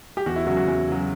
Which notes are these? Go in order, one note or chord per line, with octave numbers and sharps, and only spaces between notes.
G4
E2 F#4
E4
C#3 F#3 F#4
F#4
E2
C#3 F#3